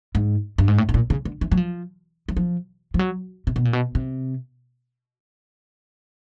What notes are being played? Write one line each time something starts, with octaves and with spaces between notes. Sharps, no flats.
G#2
G2
G#2
A2
A2
A#2
C#3
D3
E3
F#3
F3
F#3
F3
F3
F#3
C3
B2
A#2
B2
C3